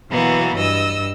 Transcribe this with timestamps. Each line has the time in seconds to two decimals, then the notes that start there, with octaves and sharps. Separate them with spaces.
0.11 B2 E3 F#3 A#3 B3
0.56 G2 D#5 E6